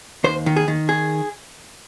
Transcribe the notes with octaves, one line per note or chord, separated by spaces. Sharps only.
D#2 C5
D#3
G#4
D#3
G#4